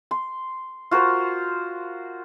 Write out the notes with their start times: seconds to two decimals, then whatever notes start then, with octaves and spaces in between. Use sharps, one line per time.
0.11 C6
0.91 F4 F#4 A#4 C5